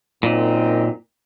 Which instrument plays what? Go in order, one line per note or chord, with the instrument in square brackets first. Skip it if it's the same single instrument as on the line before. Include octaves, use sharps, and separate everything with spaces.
[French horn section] F#2 C4 D#4 [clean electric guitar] A#2